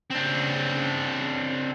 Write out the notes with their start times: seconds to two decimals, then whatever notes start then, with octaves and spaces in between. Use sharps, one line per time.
0.11 C#3 C4 D4